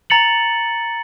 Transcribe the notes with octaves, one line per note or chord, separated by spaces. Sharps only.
A#5 A6 C#7 F#7